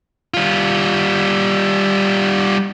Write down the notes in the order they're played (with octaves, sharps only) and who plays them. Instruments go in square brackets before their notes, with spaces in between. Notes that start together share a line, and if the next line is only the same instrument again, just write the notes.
[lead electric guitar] G3 F4